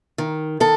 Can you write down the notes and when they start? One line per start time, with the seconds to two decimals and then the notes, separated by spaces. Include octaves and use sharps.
0.18 D#3
0.60 D#3 A4